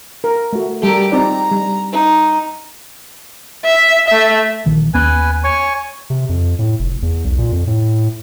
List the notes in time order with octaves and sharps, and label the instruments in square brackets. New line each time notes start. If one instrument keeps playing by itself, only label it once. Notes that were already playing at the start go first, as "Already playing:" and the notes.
[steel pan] A#4
A3 F#4
[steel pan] G3 A4 [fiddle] G4 A#4
[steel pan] C4 D#4 D5 [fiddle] A#5
[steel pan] G3
[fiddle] D#4
[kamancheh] E5
A3 E5
[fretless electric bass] A#1 D#3 E3
[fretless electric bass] D#2 B3 C#4 [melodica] B4 G#5
[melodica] C#5 G#5 C#6
[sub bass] C3
F2
A2
F1
E2
B1
A#2
F2
A2